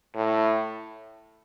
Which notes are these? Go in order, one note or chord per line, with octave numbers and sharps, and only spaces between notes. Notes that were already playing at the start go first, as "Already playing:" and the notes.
A2